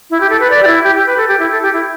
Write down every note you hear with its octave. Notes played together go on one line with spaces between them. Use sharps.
E4
G4
A4
B4
D5
G4
E4
G4
G4
B4
A4
G4
E4
A4
G4
E4